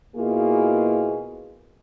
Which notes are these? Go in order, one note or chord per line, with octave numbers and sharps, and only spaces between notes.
B2 A#3 E4 F4 G#4